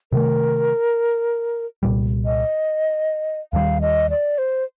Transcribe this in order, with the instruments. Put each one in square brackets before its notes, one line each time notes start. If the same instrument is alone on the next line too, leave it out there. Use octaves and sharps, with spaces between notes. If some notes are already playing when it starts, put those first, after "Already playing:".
[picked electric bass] C3 D#3 A3 [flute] A#4
[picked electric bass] C2 A#2 G3
[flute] D#5
[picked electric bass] D#2 D#3 G3 [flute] F5
[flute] D#5
D5
C5